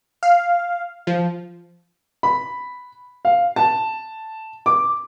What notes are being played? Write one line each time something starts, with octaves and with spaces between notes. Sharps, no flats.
F5
F3
B5
F5
A5
D6